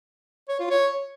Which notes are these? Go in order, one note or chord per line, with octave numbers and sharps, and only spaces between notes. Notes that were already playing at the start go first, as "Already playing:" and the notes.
C#5
F4
C#5